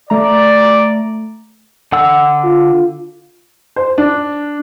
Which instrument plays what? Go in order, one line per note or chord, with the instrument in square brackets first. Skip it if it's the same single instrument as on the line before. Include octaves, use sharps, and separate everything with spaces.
[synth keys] A3 A#5 [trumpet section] D5
[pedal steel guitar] D3 F#5 E6
[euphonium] F4
[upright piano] C5
D4